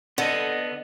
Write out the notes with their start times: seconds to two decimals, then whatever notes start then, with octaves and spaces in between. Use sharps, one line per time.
0.18 D3 B3 A4 D#5